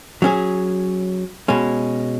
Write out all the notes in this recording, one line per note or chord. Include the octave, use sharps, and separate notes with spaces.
F#3 C#4 G#4
B2 G#3 C#4